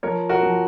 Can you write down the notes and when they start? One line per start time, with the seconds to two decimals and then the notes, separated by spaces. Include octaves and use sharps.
0.03 F3 A#4 C#5
0.29 F#4 A#4
0.43 F3